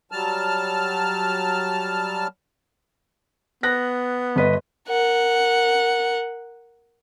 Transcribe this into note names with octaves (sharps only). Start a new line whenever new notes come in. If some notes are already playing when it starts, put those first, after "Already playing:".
F#3 G3 A5 F6
B3 F#6 A#6
G1 B4 D#5
A#4 F#5